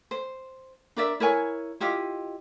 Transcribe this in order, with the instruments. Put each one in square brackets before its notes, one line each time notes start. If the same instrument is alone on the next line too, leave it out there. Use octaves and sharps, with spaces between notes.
[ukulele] C5
D4 A#4 D5 E5
E4 A#4 C#5 G#5
E4 F4 G4 D#5